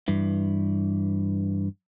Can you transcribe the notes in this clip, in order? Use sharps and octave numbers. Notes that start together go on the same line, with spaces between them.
G2 E3